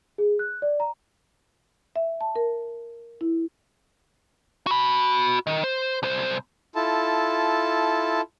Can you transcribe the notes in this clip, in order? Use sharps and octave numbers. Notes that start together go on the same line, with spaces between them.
G#4
F#6
D5
A#5
E5
A5
A#4
E4
F#4 B5
D#3
C5
C2 C5
E4 F4 A4 A5